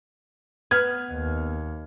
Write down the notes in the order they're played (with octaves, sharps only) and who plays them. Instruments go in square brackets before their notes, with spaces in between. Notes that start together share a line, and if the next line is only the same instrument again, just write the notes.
[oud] B3 [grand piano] F6 G#6
[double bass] D#2